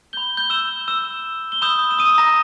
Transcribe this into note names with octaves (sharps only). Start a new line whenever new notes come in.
B5 G6 G7
G6 G7
E6 E7
E6 E7
G7
B5 D#6 E6 G6 E7
E7
D#6 D#7
A#5 A#6